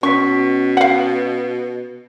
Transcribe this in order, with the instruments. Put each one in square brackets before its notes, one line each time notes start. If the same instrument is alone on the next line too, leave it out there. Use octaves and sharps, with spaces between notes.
[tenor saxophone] B2 [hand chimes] C#4 B6 [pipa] C#6
[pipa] F5 F#5